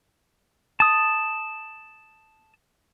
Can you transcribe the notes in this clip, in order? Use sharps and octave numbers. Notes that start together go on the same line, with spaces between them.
A5 D#6